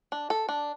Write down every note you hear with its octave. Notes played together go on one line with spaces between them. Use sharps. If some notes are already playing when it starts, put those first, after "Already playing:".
D4
A4
D4